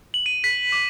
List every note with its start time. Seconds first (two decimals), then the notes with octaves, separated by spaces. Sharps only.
0.14 F#7
0.26 D#7
0.44 B6
0.72 D6